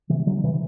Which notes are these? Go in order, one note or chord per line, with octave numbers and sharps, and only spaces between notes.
C3 E3
D3 F#3
F#3
C3 E3